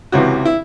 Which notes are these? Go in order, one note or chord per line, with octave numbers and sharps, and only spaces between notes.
C#2 C3 E3 F#4
E4